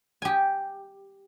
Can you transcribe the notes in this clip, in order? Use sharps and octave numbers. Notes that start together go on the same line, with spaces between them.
G4 G#5